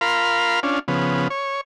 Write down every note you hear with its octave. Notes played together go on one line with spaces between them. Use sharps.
F4 A#4 F5 B5 C6
C#4 D4 F4
C#3 F3 B3
C#5